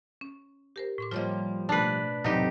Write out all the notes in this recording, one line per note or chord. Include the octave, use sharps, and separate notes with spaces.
C#4
G4 A#4 C5
A2 C6 D6
F3 G3 A#3 F4 C#5 D#5
B2 A3 D4 B4
E2 A2 C3 F#3 C4 D#4 G4